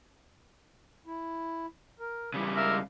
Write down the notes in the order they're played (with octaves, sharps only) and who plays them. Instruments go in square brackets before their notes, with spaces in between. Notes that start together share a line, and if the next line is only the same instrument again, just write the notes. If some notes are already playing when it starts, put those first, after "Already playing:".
[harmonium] E4
A#4
[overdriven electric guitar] C#3 G3 [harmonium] E3 E4
[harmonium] G#3 F5 [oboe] A#4 [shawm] E5